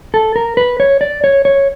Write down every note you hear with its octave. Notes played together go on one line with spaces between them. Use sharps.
A4
A#4
B4
C#5
D5
C#5
C#5